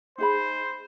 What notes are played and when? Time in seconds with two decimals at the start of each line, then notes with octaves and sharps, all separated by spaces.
0.18 D#4 G#4 C5 B5